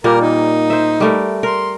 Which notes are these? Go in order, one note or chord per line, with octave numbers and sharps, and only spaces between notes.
A#2 G3 A#3 A#4
D#4
C5 E5
G3 A3 A#4
A#4 C6